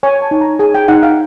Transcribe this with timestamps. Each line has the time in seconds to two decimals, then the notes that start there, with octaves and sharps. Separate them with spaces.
0.03 C#5 G#5
0.22 A5
0.31 D#4
0.41 A#5
0.59 G#4 G#5
0.74 G5
0.88 D#4 F#5
1.03 F5